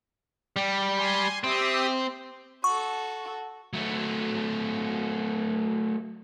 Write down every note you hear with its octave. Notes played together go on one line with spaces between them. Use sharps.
G3
G#5 C6
C4 G4 E5 D#6
F#4 A4 C#6
F#3 A3